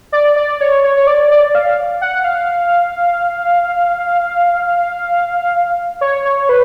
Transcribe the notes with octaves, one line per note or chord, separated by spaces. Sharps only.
D5
D5
C#5
C#5
C#5
D5
D5
F5
F#5
F5
C#5
C#5
B4